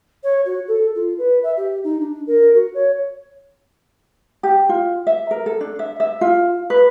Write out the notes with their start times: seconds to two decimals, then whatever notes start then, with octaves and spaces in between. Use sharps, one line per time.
0.24 C#5
0.46 F#4
0.68 A4
0.96 F4
1.18 B4
1.43 E5
1.57 G4
1.84 D#4
2.00 D4
2.27 A#4
2.55 F#4
2.74 C#5
4.43 G4
4.69 F4
5.07 E5
5.31 A#4
5.46 A4
5.61 D4
5.79 E5
6.00 E5
6.21 F4
6.70 B4